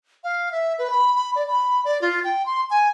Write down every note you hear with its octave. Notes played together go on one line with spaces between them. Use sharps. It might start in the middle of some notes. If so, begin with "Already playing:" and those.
F5
E5
B4
B5
B5
D5
B5
D5
F4
G5
C6
G#5